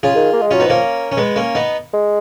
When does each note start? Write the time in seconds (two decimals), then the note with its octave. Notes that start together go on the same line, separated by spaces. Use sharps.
0.03 C#3 F4 G#4
0.16 D#3
0.33 A#3
0.41 G#3
0.51 F#3 C#4 F4
0.60 B3 D#4
0.67 F3 A#3 C#4
1.12 C#4
1.17 G#3 B3
1.36 A#3 C#4
1.55 B3 D#4
1.93 G#3